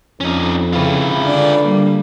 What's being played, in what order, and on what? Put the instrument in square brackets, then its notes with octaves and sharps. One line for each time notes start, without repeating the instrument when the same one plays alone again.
[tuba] F2 [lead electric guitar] C#4 D#4
[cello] C#3 E4 [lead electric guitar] F4 B4
[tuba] D3 [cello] D5
[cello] G3 A#3